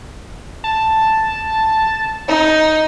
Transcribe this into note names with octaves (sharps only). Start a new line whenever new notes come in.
A5
D#4